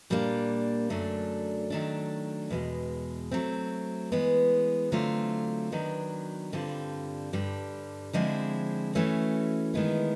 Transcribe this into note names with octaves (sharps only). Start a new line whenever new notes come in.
A#2 G3 A#3 D4
F#2 D3 F#3 A3 D4
D#3 F#3 A3 D4
E2 B2 G#3
F#3 A3 C4
E3 G#3 B3
D3 F#3 A3 C4 F4
D#3 F#3 B3 D4
G2 D3 G3 C4 F4
G2 D3 G3
D3 F3 G#3 C4 E4
E3 A3 C#4 F#4
D#3 G#3 B3 E4